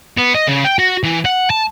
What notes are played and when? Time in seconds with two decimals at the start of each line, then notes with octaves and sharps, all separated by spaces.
0.18 B3
0.34 D#5
0.48 C#3
0.64 G5
0.79 F#4
1.04 E3
1.25 F#5
1.50 A5